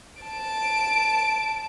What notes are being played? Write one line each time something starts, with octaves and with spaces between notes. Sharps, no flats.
A5 D7